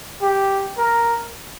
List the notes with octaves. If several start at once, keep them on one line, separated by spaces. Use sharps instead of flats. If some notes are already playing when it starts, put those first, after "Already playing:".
G4
A#4